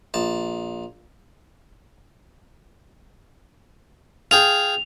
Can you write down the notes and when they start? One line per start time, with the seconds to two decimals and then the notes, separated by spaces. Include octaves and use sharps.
0.14 A#1 A5
4.31 F4 G#4 G5 F7